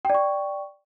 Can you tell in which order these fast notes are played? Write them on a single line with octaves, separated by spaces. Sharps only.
G5 D5 C#6